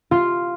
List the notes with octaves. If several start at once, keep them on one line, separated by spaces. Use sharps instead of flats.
F4